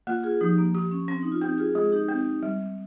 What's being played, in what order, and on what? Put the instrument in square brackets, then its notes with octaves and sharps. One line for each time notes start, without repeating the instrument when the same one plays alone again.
[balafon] A#3 [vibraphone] F4
[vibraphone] F4 G#4
[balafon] F3 [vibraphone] D#4 G4
[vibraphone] A#3
[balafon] G4
[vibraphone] C#4
[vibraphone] C4 [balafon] C#4
[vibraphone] D#4
F4
[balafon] C4 [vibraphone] D#4 G4
[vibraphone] F4 G#4
[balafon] G#3 [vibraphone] F4 G#4
[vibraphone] D#4 G4
[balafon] C4
G3